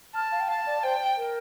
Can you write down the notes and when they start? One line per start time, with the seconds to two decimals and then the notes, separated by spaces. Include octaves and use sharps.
0.15 A5 F6
0.32 F5
0.40 G5
0.48 F5 A5
0.66 D5
0.83 C5 G5
1.17 A#4